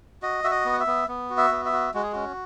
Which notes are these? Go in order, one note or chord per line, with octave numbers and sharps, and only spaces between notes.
F#4 D#5
F#4 E5
D#5
B3
F#5
E5
B3
B3
F#4
E5
B3
E5
F#4
G#3 F#4
G#4
C#4 F#4